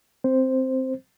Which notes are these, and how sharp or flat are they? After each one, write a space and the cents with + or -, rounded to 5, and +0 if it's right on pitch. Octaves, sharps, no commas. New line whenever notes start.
C4 +0 C5 +0